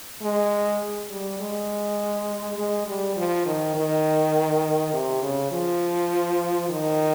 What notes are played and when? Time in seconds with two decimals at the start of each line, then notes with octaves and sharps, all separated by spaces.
0.22 G#3
1.10 G3
1.40 G#3
2.58 G#3
2.87 G3
3.17 F3
3.46 D#3
3.75 D#3
4.93 C3
5.22 C#3
5.52 F3
6.69 D#3